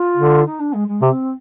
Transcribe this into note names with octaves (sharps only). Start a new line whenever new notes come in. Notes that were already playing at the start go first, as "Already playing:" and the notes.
Already playing: F4
D3
D#4
D4
G#3
G#3
C3 C4